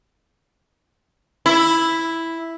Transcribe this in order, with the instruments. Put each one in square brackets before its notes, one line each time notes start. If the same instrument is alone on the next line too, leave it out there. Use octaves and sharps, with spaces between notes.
[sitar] E4